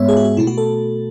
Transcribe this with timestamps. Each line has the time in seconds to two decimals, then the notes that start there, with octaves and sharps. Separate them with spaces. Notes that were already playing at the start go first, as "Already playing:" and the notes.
Already playing: G#2 G#3 B3 C#5 E5
0.08 G#4
0.17 F#4
0.24 G#4
0.37 B2 A3 E4
0.47 F#4
0.58 A4